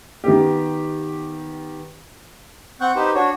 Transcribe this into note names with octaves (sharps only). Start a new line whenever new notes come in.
D#3 B3 G4
C4 F#5 C#6 F#6 G6
D#4 G4 B4 C5
D4 F#4 C#5